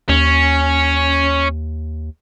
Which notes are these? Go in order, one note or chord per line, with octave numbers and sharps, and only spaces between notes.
D#2 C#4